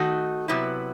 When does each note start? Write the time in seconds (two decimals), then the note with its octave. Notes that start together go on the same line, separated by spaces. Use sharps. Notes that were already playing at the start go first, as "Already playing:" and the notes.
Already playing: D#3 A3 D#4 F#4
0.48 C3 F#3 B3 E4